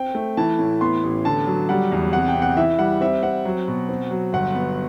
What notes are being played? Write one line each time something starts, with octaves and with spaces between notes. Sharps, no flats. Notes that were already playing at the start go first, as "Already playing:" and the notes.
Already playing: C4 G5
A3
E3 A5
A2
B3 C6
A1
D3 A5
F#3
G3 F#5
E2
C3 F#5
G5
C3
F#5
E3 E5
G3 F#5
C4 E5
C4 F#5
F#3
B2
C4
F#3
G1 F#5
B3